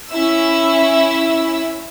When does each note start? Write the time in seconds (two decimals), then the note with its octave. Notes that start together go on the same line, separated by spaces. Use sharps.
0.11 C#4 E4 E6